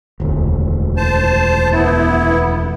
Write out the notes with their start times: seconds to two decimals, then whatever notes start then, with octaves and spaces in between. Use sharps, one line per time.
0.20 E1 D2
0.97 C5 A5
1.72 B3 E4